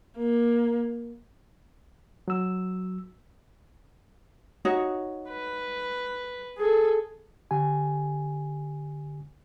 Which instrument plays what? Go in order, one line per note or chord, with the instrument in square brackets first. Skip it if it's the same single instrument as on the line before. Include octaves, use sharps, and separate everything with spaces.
[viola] A#3
[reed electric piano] F#3 E6
[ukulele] D#4 F#4 C#5
[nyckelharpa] B4
G#4 A4
[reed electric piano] D3 G4 G#5